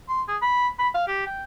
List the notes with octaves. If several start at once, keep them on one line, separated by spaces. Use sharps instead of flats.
C6
G#4
B5
B5
F5
G4
G5